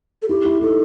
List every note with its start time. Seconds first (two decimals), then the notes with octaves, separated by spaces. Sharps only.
0.22 A4
0.29 E4 G4
0.45 E4
0.62 D#4 A4